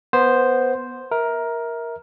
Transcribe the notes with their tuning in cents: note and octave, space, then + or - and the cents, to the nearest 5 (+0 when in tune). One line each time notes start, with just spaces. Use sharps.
B3 -10 C5 +0
A#4 +10 E5 -25